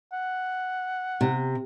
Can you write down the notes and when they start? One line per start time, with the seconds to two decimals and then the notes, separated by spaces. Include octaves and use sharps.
0.12 F#5
1.21 C3